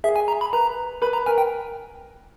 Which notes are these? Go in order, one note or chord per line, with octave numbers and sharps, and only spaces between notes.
G#4 E5
G#5
A#5
B5
B4 A#5
B4 B5
A#5
A#4 G#5
G5